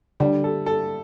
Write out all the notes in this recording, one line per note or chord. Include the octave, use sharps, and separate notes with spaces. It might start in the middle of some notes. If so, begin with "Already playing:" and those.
D3 G3
A4
A4